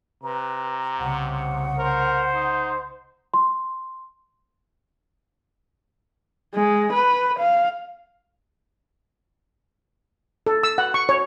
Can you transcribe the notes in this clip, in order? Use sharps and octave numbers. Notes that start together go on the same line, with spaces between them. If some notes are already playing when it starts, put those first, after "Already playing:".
C3 B4 A#5
C2 C#3 F#5
A#4 C5
D#4
C6
G#3
B4
F5
A4
E6
F#5
C#6
C#5